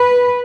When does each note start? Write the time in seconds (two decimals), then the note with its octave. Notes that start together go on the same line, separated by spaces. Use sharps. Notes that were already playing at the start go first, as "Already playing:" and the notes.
Already playing: B4